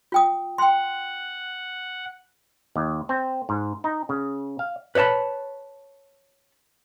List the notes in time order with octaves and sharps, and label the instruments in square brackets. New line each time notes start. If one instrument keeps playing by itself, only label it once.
[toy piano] F4 G5 D#6
[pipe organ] F#5 [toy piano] G5 C6
[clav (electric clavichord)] D#2
C4
G#2
D#4
C#3
F5
[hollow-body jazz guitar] B4 C#5 D#5 A5 B5